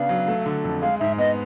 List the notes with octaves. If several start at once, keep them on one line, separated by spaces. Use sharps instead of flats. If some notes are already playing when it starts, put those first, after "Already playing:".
Already playing: C#3 B3 D4 F5
F#3
A3
D3
F2
G#3 F5
G#2 E5
B3 D#5